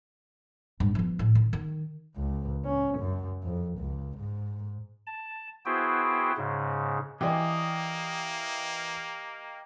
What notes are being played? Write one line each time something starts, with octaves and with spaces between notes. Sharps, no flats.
G2
F3 B3
A2
D#3
D#3
C#2
C#4
F#2
F2
C#2
G#2
A5
B3 E4 F#4 G#4 C5 G5
G#2 C#3
E3 A#3 G4 D5 D#5 G#5 C6